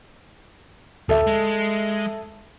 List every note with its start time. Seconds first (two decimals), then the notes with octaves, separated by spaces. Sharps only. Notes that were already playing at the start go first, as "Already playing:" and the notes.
1.09 D2 A4 E5
1.27 G#3